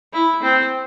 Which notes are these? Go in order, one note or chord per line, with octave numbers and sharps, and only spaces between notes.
E4
C4